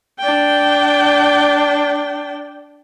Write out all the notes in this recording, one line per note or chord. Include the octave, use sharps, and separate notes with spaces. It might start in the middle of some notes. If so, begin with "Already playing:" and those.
D4 G5